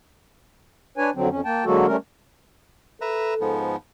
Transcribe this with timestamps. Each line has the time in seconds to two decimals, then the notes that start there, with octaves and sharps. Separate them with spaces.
0.98 D4 B4 C#5 G#5
1.15 F2 D3 F#3 C4
1.30 F2 C#4
1.45 A#3 G5 A5
1.65 D3 F#3 G#3 A#3 F#4 A4
1.86 G3 A3 C#4 A#4
3.01 A4 B4 E5 A#5
3.41 G#2 F3 B3